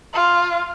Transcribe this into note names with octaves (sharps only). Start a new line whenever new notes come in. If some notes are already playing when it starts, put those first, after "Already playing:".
F4